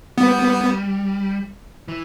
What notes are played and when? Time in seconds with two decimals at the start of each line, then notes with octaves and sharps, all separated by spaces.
0.18 G3 B3
1.88 E3